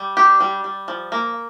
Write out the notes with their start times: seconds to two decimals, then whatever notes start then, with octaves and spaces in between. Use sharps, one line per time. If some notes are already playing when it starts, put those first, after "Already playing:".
Already playing: G3
0.17 D4 G4
0.40 G3
0.64 G3
0.88 F3
1.12 A#3